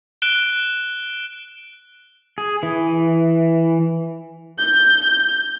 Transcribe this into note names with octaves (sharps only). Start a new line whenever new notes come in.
F#6 D7 E7 G7
G#4
E3
G6